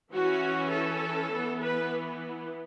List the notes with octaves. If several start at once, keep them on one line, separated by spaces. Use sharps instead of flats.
E3 C#4 F#4
A4
E3 B3
B4